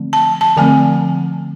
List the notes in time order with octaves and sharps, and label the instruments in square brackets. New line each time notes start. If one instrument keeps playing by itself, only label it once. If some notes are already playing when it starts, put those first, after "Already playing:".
Already playing: [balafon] D3 F3 A3 C4
A5
A5
D3 F3 A3 C4 G#5